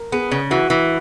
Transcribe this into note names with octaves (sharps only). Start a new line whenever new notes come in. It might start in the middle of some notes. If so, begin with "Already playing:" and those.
Already playing: A#4
B3 G#4
C#3
E3 F#4
E3